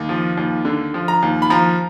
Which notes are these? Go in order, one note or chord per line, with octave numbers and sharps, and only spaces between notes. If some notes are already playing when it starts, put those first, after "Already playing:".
Already playing: D#2
F3
D#2
D3
F3
A#5
D#2
B5
F3 A#5